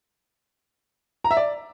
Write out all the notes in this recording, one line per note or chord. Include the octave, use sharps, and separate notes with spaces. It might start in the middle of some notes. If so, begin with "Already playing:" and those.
A#5
E5
D5